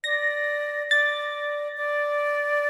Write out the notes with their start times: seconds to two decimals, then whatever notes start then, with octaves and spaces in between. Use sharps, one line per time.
0.04 D5 A#6
0.90 D5 A6
1.77 D5